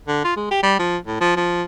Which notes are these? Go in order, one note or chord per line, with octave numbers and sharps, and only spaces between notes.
D3
F4
G#3
G4
G3
F3
A2
F3
F3